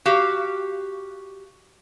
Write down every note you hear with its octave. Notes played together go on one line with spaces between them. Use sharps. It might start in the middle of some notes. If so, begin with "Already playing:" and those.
F#4 G4 F5